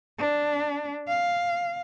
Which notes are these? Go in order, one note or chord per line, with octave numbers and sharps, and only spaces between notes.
D4
F5